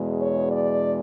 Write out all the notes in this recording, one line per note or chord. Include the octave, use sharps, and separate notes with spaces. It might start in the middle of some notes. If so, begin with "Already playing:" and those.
Already playing: E2 B2 G#3
C#5
D5